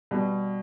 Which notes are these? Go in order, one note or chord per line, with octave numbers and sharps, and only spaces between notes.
B2 G3